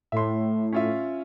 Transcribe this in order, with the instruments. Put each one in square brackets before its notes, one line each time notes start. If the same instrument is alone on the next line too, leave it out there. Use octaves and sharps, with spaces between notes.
[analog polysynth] A2 [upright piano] E5 C6
[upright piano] C#4 F4 E5